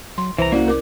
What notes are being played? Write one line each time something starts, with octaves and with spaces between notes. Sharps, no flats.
F#3 C6
C2 E3 C5 A#5
A#3 C#4 E4 F#4 D5
A#4 D6